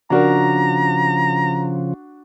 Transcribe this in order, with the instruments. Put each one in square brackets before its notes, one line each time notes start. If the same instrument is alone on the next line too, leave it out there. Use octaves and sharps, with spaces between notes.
[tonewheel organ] C#3 F3 [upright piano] D4 F#4 A#4 [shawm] A#5